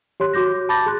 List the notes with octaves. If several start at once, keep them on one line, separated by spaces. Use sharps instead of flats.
G4 C#5 C6 F#6
F#4 D6 G6 A#6
A5 B5 D6 G6 A6 A#6
G#4 C6 F#6